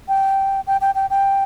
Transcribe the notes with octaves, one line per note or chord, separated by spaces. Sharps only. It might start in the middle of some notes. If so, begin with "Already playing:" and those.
G5
G5
G5
G5
G5